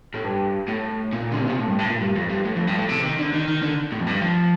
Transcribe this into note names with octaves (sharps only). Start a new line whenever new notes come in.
A2
G2
A2
A#2
D3
C3
A#2
A2
G2
A2
A#2
G2
F2
G2
A2
F2
G2
A2
C3
D#3
D3
D#3
D#3
D3
A2
F2
G2
F3